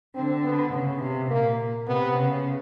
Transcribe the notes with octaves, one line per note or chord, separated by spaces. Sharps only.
D3 C4
B3
C#3
C3
A#2 A#3
C3 B3
C#3